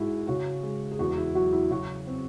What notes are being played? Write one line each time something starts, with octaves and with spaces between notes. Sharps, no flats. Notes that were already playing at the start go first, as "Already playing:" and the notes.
Already playing: G#2 G#3 E4 F#4
C#3 F#4
G#3
G#4
E2 F#4
E4
F#3 F#4
E4
C#3 F#4
C4